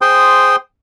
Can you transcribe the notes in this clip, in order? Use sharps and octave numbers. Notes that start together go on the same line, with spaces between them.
G#4 C5 G5 C6 D#6